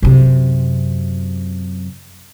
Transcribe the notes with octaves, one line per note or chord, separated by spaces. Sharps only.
F#2 C3